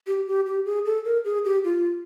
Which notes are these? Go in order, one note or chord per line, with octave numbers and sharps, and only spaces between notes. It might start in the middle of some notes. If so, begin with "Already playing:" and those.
G4
G4
G4
G#4
A4
A#4
G#4
G4
F4